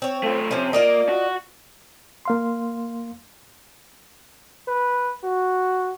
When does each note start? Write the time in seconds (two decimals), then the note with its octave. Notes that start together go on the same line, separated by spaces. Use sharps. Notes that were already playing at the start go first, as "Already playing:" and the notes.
0.02 C4 C#5
0.23 A3 F4
0.51 C3 F3 C#4
0.73 A#3 F4 D5 D#5
1.09 F#4
2.25 A#3 F5 C6
4.68 B4
5.24 F#4